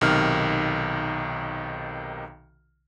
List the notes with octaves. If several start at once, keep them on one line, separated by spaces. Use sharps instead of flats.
B1 C3 D#3 F6